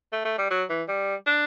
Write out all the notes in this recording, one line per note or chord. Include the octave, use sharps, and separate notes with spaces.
A3
A3
G3
F#3
E3
G3
D4